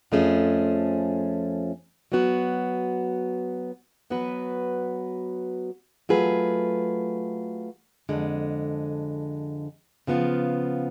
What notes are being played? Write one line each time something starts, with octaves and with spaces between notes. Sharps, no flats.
F2 F3 A3 C#4 G#4
F#3 B3 F#4
F#3 B3 F#4 B4
F#3 A3 F4 G#4 B4
F2 D3 G#3
C#3 F3 B3 F4